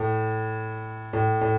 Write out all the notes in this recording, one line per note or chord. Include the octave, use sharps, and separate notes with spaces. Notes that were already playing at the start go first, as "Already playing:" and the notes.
Already playing: A2
A2
A2